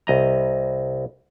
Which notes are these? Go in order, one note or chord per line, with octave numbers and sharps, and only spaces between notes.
C2 D#5 A#5